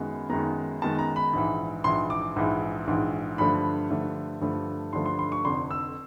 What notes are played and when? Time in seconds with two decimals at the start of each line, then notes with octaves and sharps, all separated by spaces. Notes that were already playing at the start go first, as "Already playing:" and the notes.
Already playing: F#2 D#3 G#3 B3
0.29 F#2 D#3 G#3 B3 A#5
0.82 F#2 D#3 G#3 B3 A5
0.99 A#5
1.16 B5
1.33 A#1 G#2 E3
1.84 A#1 G#2 E3 C6
2.10 D6
2.36 A#1 G#2 E3
2.87 A#1 G#2 E3
3.38 G2 D3 F3 A3 B5
3.90 G2 D3 F3 A3
4.41 G2 D3 F3 A3
4.93 G2 D3 F3 A3 C6
5.06 C6
5.19 C6
5.32 C#6
5.45 F1 F2 D3 C6
5.71 E6